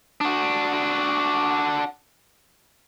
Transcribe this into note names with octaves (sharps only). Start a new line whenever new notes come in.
D4 F#4